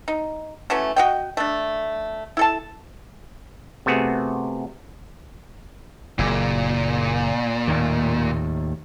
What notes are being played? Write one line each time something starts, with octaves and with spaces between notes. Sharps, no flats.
D#4
E3 F#3 A3 C#4
F#4 D#5 G5
A3 D4
E4 A4 A5
C3 A3 B3 F#4 G#4
F#1 A#2
D#2 A2 D#3